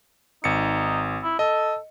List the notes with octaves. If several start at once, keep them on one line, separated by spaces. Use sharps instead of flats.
G#1 D#4 C#7
E4
A4 D#5